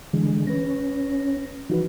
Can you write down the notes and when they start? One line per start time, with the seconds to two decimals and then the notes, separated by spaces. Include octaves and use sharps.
0.13 D3 E3 G#3
0.47 C#4 B4 A#6
1.69 E3 F3 D#4 F#4 B4